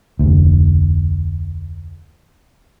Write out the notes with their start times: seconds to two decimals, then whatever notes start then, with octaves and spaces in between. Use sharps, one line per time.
0.19 F1 D2